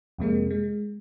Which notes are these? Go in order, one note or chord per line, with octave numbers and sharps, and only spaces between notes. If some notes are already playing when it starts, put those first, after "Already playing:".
F2 C3 G#3 A#3
G#3